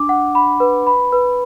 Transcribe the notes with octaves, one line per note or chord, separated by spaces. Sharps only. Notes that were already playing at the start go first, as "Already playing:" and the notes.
Already playing: D4 D6
F#5
B5
B4
B5
B4